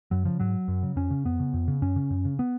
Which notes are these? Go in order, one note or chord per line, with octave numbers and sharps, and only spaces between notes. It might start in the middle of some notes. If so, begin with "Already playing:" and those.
F#2 F#3
C#3 F3
G#2 F#3
F#2
C#3
F2 C#4
C#3
F2 B3
C#3
F2
C#3
F#2 C#4
C#3
F#2
C#3
B3